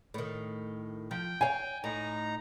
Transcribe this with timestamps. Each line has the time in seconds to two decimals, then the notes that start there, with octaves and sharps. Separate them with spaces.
0.14 A2 D#3
1.11 F3 G5
1.41 C#5 F5 G#5
1.84 A2 D#4 A#5